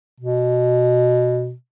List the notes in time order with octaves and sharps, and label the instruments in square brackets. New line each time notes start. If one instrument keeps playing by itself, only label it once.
[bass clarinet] B2